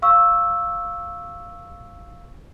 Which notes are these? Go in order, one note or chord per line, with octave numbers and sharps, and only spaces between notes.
F5 C#6 E6